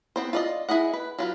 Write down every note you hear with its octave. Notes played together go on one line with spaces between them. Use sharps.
B3 C4 C5
F4 D5 D#5
E4 G#4 D#5 F#5
B4
F#3 F4 B4